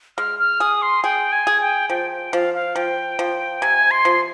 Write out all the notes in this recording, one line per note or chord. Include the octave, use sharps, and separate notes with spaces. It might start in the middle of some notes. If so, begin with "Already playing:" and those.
G#3 F6
F6
G#4 D#6
C6
G#4 G5
G#5
G#4
G5
F3 G5
G5
F3 F5
F5
F3 G5
F3
C3 G#5
C6
F3